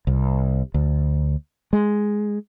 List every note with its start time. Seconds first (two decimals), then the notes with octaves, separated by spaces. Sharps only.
0.07 C2
0.74 D2
1.73 G#3